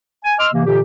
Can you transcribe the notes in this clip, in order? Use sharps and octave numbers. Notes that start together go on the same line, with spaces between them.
G#5
D#5 C6 D6 E6 F6
C3 E3 A#3
A#2 D3 E3 G4